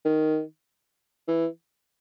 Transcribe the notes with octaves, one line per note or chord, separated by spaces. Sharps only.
D#3
E3